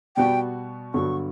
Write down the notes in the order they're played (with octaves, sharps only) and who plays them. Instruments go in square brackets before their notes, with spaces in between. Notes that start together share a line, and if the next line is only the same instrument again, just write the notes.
[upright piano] B2 G3 B3 F#4 [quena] G5
[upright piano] G2 D3 F#3 B3 F#4 [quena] C#6